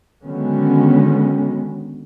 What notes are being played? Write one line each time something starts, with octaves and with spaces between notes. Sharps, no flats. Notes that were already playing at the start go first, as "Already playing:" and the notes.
D3 D#3 F#3 G#3 B3 C#4